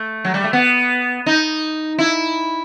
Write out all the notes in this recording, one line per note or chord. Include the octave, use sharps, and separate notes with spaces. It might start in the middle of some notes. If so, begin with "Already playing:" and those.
Already playing: A3
F#3
G3
A3
B3
D#4
E4